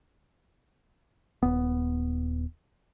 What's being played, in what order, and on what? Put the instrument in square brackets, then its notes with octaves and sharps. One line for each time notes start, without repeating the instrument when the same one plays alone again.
[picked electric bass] D#1 B3